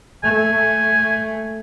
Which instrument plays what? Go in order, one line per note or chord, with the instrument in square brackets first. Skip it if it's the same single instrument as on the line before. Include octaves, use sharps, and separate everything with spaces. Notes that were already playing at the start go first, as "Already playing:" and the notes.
[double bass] A3 [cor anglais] G#5